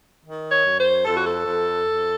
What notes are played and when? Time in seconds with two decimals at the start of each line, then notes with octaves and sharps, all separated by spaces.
0.23 D#3
0.50 C#5
0.64 F#2
0.77 C5
1.05 F2 A4
1.14 F#4
1.25 A4
1.44 F2
1.85 F2